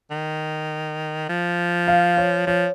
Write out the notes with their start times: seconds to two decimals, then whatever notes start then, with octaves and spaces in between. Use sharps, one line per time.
0.11 D#3
1.29 F3
1.88 F5
2.17 C#5
2.47 F3 C#5